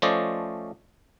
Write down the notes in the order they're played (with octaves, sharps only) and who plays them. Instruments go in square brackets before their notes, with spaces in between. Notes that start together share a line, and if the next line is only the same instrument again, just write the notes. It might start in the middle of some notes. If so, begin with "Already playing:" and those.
[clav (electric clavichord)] F3 A3 C#4 C5 D5 D#5